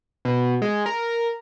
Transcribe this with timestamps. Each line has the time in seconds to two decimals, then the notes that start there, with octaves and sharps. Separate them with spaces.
0.25 B2
0.62 G#3
0.86 A#4